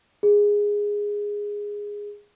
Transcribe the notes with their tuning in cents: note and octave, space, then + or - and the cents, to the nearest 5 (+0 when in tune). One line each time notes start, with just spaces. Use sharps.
G#4 -10